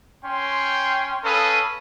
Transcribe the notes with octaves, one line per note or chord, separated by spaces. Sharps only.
C#4 G5 C6
C#4 A4 B4 F5 D#6